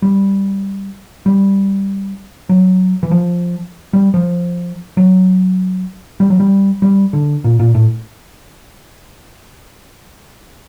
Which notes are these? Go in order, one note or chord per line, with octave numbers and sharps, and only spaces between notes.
G3
G3
F#3
E3
F3
G3
F3
F#3
G3
F#3
G3
G3
D3
A#2
A#2
A2